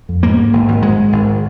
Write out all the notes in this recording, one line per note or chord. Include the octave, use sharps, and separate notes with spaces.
F2
G#2 A#3
G#2
G#1
G#1
G#2 G#3
G#2
G#1